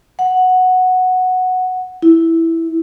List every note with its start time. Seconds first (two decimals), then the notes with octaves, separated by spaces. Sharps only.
0.19 F#5
2.02 E4